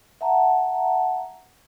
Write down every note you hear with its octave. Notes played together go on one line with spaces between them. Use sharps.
E5 F#5 A5 A#5